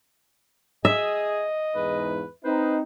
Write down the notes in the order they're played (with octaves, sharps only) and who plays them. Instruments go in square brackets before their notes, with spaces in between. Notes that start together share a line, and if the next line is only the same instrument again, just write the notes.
[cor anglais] G#4 [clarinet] D#5 [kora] E5
[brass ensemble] E2 G#2 [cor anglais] B4
[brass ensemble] C4 D#4 [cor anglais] B4 [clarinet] C5